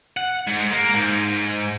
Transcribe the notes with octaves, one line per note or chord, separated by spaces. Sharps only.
F#5
G#2
A#3
G#2